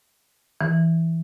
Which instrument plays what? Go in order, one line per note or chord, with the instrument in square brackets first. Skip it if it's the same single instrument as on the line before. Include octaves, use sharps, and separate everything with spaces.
[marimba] E3